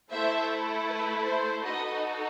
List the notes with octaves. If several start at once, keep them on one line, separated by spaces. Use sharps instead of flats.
A3 E4 A4 C5 E5
B4
C5
D#4 F#4 A4 B4 D#5